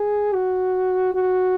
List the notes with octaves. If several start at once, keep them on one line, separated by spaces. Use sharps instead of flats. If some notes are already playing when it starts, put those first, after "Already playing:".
Already playing: G#4
F#4
F#4